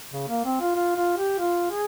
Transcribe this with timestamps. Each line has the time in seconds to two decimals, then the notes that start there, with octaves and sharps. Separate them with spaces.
0.12 C#3
0.28 A#3
0.45 C4
0.60 F4
0.75 F4
0.96 F4
1.18 G4
1.39 F4
1.71 G#4